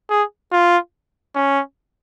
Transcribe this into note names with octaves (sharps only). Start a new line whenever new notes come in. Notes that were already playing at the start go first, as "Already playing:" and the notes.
G#4
F4
C#4